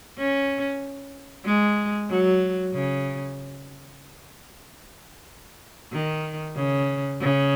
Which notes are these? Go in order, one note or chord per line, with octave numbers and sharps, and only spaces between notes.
C#4
G#3
F#3
C#3
D#3
C#3
C#3